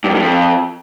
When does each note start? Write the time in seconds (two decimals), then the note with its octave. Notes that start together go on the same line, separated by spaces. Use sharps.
0.04 G2
0.09 F2
0.15 G2
0.20 F2